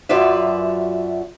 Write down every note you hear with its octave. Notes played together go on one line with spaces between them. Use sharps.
F#2 F#3 F4 B4 D5 E5